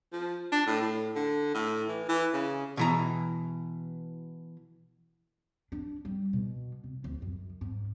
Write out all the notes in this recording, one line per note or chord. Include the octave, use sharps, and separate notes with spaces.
F3
D4
A2
A2
D3
A2
E3
E3
C#3
B2 E3 A#5
D4
G3
B2
C2
D2
F#2
G#2